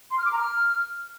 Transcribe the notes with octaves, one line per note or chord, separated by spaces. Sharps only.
C6
F6
D6
A#5
F6